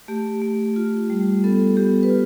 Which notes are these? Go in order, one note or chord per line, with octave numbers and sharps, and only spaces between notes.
A3 G4
A3
F4
G3
B3 A4
B3 G4
B4
F4